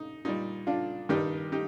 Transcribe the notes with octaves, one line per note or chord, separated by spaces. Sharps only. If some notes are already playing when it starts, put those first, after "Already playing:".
Already playing: D#4
A#2 G3 D#4
D4 F4
G2 D#3 G3 D#4 G4
D#4 G4